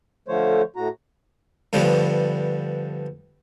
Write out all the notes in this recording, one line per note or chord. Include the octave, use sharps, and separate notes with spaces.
D3 F3 A3 C5 C#5
A2 F#4 A#5
G2 D3 F3 G3 B3